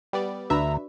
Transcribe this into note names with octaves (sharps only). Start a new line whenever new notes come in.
G3 B3 D5
D2 D4 F#4 B4 E5 A#5